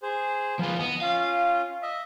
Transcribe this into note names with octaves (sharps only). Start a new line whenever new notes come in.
G#4 C5
F3 B3 F4 B4
B3 D#5
C#4 F4 F5
D#5 E5